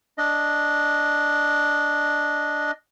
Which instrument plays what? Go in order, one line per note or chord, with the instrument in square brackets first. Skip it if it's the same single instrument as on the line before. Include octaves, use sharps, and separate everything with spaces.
[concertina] D4 D#5